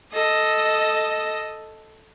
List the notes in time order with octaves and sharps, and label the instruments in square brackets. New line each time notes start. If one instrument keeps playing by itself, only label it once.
[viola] A4 D#5